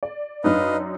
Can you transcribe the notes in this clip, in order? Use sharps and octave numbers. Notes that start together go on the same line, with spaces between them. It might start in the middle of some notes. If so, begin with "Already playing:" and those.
D5
F#2 D4 D#4 B4 D#5 F5